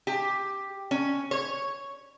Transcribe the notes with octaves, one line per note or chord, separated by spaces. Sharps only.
G4
C#4
C#5